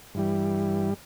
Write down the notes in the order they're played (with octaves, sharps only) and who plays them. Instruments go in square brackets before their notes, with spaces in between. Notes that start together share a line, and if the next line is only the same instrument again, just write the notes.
[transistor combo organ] G2 E3 G3